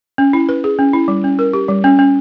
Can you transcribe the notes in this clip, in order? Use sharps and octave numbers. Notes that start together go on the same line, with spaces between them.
C#4
E4
B4
G#4
C#4
E4
G3
C#4
A#4
G4
G3
C#4
C#4